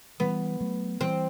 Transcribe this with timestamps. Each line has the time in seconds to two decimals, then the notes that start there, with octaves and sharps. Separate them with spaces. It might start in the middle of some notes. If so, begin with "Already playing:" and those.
0.20 E3 G3 B3
0.60 F#3 A3
1.01 E3 G3 C4